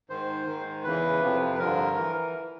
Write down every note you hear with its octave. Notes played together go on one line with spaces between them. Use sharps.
G#2 D#3 C5
G#2 D#3
E2 C#3 E3 B4
F2 C3 F3
B4
G2 D3 F3 A#4
E3